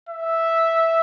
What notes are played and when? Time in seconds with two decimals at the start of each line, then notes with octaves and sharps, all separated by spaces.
0.09 E5